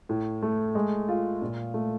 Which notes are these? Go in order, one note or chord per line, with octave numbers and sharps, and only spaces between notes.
A2
A3
G#3
F4
A#2
A3